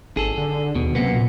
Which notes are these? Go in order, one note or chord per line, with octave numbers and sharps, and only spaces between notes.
G#1 G#4 A4
D3
D#2 B2
F#2 C3 A#3 B3
A#2